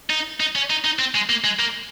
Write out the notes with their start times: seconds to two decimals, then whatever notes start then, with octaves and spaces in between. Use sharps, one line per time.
0.10 D#4
0.40 D#4
0.55 C#4
0.70 D#4
0.85 D#4
0.99 C4
1.15 G#3
1.30 A#3
1.44 G#3
1.59 A#3